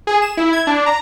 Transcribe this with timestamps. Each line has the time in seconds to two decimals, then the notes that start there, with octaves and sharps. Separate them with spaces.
0.07 G#4
0.22 E7
0.37 E4
0.53 G#6
0.67 D4
0.86 A#5